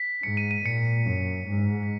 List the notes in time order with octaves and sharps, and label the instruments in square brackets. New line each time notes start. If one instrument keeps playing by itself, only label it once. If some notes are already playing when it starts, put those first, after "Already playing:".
Already playing: [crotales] B6
[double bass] G#2 [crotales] C#7
[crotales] D#7
D#7
[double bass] A#2 [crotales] C#7
[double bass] F#2
G#2
[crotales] B6